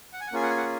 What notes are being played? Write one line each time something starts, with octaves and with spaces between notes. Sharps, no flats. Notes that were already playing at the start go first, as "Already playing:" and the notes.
F#5
G#5
F#5
A#3 C#4 F4 G#4 G#5
F#5
G#5
F#5